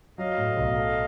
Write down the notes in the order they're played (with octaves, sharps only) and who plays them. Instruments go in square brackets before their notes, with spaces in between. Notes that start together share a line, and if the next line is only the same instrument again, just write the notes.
[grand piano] F#3 [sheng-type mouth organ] D#5 F5
[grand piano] A2
B1
A3